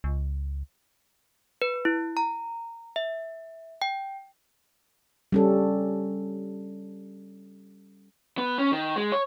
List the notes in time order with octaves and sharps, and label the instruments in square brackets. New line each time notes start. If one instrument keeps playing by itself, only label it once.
[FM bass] C#2
[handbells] B4
E4
A#5
E5
G5
[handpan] G3 C#4 A4
[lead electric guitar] B3
C#4
D#3
G#3
C#5